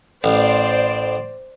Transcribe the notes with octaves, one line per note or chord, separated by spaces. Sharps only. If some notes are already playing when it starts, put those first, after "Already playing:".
A1 C5 D5